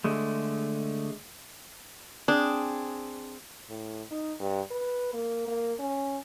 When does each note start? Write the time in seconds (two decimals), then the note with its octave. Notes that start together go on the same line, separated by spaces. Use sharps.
0.04 D3 G#3 A3
2.28 C4 D4 G#4 G5
3.70 A2
4.11 D#4
4.40 G2
4.71 B4
5.13 A#3
5.47 A#3
5.79 C#4